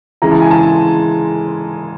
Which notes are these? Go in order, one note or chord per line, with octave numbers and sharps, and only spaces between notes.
C#3 E3 G#3 A#5
A5
G#5
A5